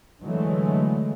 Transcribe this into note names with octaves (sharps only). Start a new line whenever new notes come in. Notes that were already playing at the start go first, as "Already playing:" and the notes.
D3 E3 F#3 G#3 A3